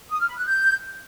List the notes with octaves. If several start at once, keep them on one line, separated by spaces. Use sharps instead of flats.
D#6
F6
B5
F#6
G6